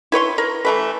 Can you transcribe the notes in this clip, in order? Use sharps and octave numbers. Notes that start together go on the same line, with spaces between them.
E4 B4 C#5 C6
A#4
E3 A3 B4